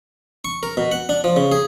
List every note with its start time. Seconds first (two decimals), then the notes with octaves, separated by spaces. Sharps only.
0.45 C#6
0.63 A#4
0.77 B2
0.92 F#5
1.09 D4
1.24 F3
1.36 C#3
1.52 G#4